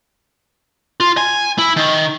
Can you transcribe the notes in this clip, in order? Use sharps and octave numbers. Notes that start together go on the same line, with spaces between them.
F4
G#5
E4
D#3